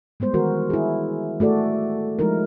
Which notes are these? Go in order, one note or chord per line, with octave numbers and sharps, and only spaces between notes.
G3 G#3 B3 C5
D#3 E3 F#4 A#4
E4 G#4
A3 F#4 A4 D5
F3 G#3 D#4 E4 A#4